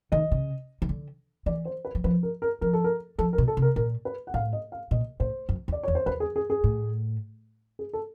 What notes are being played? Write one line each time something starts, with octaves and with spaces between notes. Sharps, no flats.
D#3 D#5
C#3
D#3
D3
E3 D5
C5
B4
F#3
F3 B4
A#4
A#4
F3 A#4
A4
A#4
F3 A4
A#4
B2
A4
C3
A#4
A#2 A#4
B4
F#5
A2 F5
D#5
F5
A#2 D#5
A2 C5
F#2
E2
D5
E2 C#5
C5
E2 B4
G#4
G#4
G#4
A2
G#4
A4